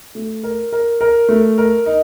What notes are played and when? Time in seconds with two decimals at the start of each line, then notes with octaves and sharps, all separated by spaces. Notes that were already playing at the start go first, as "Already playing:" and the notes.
0.15 A3
0.44 A#4
0.73 A#4
1.01 A#4
1.29 A3
1.58 A#4
1.86 D#4